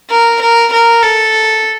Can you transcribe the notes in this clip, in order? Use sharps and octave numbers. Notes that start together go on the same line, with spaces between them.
A#4
A#4
A#4
A4